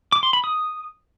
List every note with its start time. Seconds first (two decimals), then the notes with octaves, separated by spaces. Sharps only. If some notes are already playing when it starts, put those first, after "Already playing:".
0.12 D6
0.23 C6
0.33 B5
0.44 D#6